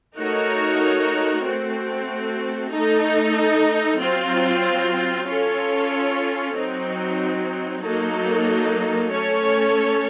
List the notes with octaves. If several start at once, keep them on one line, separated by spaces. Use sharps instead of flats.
A3 D#4 F#4 A#4 C#5
A3 C4 F#4
A3 D#4 A4
F#3 C4 F4
C#4 F4 A4 C#5
F#3 C4 D#4
F#3 A#3 D#4 A4
A3 C#4 A4 C#5